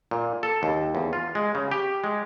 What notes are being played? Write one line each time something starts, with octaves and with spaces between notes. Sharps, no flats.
A#2
A4
D#2
E2
F4
G#3
C#3
G4
G#3